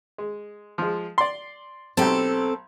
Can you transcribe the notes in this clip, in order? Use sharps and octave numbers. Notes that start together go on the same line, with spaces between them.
G#3
F3 G#3
D5 C6
B1 C4 G4 A4 A5